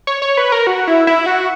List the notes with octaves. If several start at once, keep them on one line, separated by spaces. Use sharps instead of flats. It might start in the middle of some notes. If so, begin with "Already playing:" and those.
C#5
C#5
B4
A#4
F#4
E4
E4
F#4